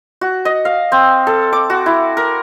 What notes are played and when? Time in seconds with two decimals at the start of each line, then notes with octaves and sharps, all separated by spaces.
0.21 F#4
0.45 D#5
0.65 F5
0.92 C4
1.27 A4
1.53 D6
1.70 F#4
1.86 E4
2.17 A#4